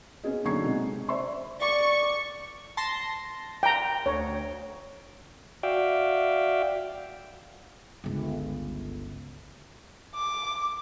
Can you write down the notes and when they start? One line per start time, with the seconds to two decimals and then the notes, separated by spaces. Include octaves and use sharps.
0.24 B3 C#4 G#4 D#5
0.45 B1 D3 D#4 C#6 G#6 C7
0.65 C3 G#3
1.09 C5 D5 E5 C6 C#6
1.61 D5 C#6
2.77 A5 C6 A#6
3.63 G5 A#5
4.06 D2 C#5
5.63 F#4 D5 E5 F5 G5
8.04 G1 C#2
10.15 D6